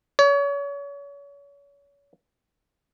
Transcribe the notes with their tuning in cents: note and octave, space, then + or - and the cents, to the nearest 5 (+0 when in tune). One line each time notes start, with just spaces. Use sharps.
C#5 +35